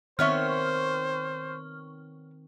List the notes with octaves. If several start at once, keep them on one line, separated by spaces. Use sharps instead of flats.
D#3 B3 C4 C5 C#5 E5 C#6 F6